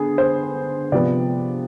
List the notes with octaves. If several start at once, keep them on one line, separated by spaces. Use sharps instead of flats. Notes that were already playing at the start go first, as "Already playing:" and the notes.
Already playing: D3 B3 G#4
C5
C3 F3 B3 D5